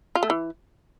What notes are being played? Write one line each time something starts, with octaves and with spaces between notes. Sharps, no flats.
F4
A3
E3